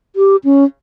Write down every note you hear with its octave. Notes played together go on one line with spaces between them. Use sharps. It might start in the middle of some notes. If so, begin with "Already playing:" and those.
G4
C#4